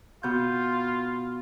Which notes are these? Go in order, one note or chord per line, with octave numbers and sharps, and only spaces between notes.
B2 F4 G6